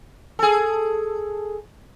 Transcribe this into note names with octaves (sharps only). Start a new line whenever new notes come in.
G#4 A4